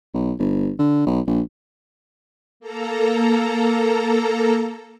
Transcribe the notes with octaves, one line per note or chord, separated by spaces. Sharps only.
B1
G1
D3
B1
A#1
A#3 A4 A#5